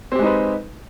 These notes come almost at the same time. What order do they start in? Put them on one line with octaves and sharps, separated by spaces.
C4 G4 G#3 D#4 B4